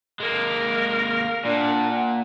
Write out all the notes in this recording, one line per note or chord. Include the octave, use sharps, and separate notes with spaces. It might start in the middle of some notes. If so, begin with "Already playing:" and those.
G#3 A#3 A#4
F5
A#2 D4 D5 F#5
F#5